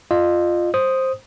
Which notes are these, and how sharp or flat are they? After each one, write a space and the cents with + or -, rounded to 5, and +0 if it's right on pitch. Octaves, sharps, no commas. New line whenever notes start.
F4 +0 D#5 -35
C5 +10 D#6 +0